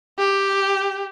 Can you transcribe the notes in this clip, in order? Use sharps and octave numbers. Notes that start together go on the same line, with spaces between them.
G4